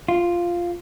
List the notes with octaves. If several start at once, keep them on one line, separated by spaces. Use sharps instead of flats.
F4